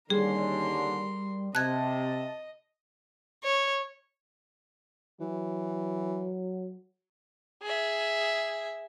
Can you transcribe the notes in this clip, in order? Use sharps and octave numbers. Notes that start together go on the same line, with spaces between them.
D#2 D3 G3 C#4 G#4 A#4 C6
C3 D#5 A5 F#6 G#6
C#5
E3 F#3
G#4 E5